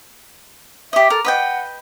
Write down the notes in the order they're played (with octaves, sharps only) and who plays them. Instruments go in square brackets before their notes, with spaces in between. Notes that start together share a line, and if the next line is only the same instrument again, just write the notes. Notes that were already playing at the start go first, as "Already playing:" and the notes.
[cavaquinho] G4 D#5 [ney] E5
[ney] A4 [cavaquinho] A#4
[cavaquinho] B4 D#5 G5 [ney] F#5